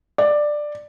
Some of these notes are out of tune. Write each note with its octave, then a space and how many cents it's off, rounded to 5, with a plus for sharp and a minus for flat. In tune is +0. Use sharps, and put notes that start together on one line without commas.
D5 +10